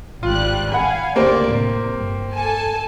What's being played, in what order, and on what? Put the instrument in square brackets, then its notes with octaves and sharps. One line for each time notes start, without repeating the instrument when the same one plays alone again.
[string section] G#1 G3 F#6 [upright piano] F4
[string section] F5 G#5 [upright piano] F#5 B5
[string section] D2 D3 D5 [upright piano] A#3 G4 C5
[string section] A2 C3
G1
A4 G#5 A5